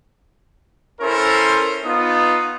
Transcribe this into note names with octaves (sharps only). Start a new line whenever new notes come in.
C#4 E4 A4 A#4 C5
B3 D#4 F4 D#6